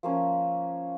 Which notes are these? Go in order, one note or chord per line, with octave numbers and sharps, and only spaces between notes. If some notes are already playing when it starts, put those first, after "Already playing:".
F3 A#3 C#4